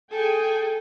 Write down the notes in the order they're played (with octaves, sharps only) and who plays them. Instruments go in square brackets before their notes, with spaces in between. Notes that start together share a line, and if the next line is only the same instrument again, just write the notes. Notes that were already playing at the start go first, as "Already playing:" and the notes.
[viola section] G#4 G5 G#5 [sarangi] A4